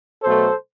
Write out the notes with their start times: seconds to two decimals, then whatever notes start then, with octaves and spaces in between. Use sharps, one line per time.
0.23 B2 F#3 A3 A4 C5